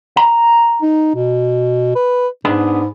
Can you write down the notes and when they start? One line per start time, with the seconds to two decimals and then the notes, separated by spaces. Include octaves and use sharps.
0.17 A#5
0.82 D#4
1.15 B2
1.95 B4
2.45 G#2 B3 D4 G#4